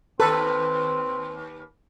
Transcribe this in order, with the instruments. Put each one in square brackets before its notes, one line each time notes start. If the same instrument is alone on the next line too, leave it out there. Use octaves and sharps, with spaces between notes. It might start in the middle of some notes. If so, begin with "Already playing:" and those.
[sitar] D#2 B4 [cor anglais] C4 [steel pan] A4